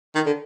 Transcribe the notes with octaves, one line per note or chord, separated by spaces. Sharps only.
D#3
D3